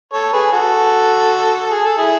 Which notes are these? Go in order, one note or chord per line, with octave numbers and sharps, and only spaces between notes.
A4 C#5
G#4 B4
F#4 A4
G#4
A4
E4 G#4